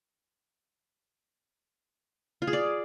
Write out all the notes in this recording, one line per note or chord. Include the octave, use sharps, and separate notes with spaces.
F4
G#4
D5